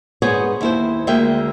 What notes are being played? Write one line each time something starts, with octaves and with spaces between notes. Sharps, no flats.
G#2 B3 G#4 C5 C#5
D#2 E4 C5
D2 G#3 A#3 E5 G5